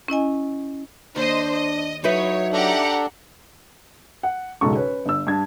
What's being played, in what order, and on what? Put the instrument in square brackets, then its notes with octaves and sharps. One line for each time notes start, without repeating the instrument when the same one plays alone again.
[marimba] C#4 E4 D#5 G#5
[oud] D#2 [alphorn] D4 [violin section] C5 D#5
[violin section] D#5
[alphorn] F#3 [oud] D#4 E4 B4 [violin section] C#5
[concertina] D4 A4 [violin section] G4 F#5 A#5
[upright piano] F#5
E1 B1 G#2 C#3 A4 C#6
C#4 B4 C#5
G1 E6
G2 A5 G#6